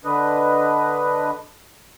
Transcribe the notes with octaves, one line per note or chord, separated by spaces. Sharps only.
D3 D4 B4 D#5